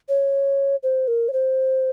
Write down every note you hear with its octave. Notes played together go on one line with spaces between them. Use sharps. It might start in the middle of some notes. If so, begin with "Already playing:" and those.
C#5
C5
A#4
C#5
C5